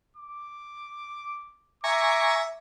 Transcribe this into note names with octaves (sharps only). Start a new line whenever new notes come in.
D6
E5 G#5 A#5 C#6 D6